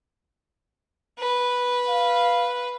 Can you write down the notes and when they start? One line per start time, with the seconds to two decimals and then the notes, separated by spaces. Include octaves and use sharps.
1.19 B4
1.88 F5